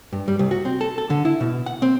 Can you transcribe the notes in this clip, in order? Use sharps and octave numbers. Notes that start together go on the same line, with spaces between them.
G2
G3
C2
F#4
C4
A4
A4
D3
E4
B2
F#5
C4